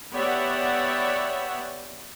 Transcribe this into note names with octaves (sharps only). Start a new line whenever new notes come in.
B3 G4 C#5 D5 E5 F#5